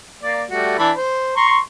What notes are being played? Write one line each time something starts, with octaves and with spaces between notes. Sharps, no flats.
A#3 D5
G3 A3 F#4
E3 D4 B5
C5
A#5 C6 C#6